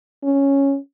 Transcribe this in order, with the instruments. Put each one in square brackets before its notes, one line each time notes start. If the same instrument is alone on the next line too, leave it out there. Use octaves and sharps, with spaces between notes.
[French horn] C#4